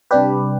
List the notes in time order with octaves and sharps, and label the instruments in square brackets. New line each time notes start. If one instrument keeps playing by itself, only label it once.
[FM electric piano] C3 G3 D4 G4 B4